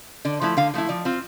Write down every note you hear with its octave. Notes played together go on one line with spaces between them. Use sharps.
D3 D5
F3 A3 E4
D3 F5
F3 A3 E4
F3 D5
C4 F4